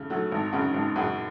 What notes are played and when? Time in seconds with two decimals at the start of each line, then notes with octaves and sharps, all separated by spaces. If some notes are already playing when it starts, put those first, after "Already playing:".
Already playing: C#3 A3
0.10 F#3 A3
0.32 G#1
0.53 F#2 C#3
0.74 G#1
0.96 F#2 C#3